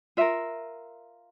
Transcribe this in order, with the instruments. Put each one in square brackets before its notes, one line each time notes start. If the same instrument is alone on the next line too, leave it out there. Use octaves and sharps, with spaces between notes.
[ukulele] F4 A#4 E5